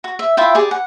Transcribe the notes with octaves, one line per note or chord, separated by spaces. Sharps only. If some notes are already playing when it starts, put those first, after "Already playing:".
F#4
E5
E4 F4 E5 G5
G4 G#4 D5
F#5